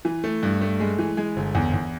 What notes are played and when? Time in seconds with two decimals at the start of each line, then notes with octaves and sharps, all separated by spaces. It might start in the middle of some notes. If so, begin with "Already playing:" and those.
0.05 E3
0.24 A3
0.43 G2
0.61 A3
0.80 G#3
0.99 E3
1.17 G#3
1.36 G1
1.55 E2
1.74 E2